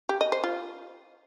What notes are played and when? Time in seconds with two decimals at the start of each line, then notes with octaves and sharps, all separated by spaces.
0.09 G4
0.21 D#5
0.32 C5
0.44 F4